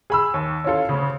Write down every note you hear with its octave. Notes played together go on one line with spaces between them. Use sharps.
G#4 B5 E6
D#2
C#4 E4 F4 A4
D2 C#3